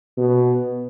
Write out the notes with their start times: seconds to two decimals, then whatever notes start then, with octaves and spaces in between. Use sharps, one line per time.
0.18 B2